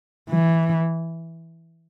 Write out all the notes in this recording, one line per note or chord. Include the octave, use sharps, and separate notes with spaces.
E3